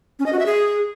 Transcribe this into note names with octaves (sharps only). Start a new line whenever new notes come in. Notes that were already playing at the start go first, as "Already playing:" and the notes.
C#4
D#5
F#4
E5
G#4